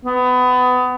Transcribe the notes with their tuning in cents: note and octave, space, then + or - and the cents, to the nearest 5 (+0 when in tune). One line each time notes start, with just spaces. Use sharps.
B3 +25